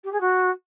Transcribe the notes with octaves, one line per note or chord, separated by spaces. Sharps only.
G4
G#4
F#4